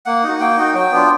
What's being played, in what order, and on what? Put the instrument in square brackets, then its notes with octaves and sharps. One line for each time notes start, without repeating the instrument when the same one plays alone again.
[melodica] A#3 F#5
D#4 F#4
A#3 G5
D#4 F#4
F#3 G5
B3 D4 F4